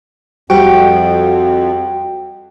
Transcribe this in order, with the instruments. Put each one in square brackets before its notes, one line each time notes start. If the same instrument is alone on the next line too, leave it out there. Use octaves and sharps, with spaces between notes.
[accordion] F2 [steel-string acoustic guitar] G3 C5 F#5 [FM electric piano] F#4 [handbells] G5